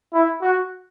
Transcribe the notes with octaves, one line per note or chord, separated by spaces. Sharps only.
E4
F#4